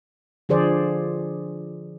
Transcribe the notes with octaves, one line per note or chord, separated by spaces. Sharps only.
D3 F3 G#4 C5 D5